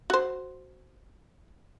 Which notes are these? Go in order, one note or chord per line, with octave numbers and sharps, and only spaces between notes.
F#4 C5